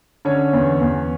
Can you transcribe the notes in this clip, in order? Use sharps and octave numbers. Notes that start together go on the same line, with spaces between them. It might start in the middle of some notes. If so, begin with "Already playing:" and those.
D3 C#4 C#5
E2
E2